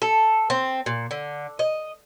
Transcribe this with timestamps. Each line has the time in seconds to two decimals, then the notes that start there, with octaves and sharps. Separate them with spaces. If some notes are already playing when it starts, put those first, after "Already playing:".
0.02 A4
0.50 C4
0.86 A#2
1.11 D3
1.59 D#5